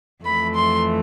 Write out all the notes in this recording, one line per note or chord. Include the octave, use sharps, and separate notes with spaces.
F2 E3 A3 B5
C6